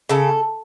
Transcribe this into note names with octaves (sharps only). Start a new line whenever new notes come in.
C#3 A4